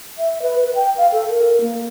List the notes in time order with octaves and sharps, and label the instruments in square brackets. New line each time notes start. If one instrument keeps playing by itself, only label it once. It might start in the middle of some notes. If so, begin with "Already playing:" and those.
[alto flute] E5
B4
B4
G5
F5
A4
A#4
A#3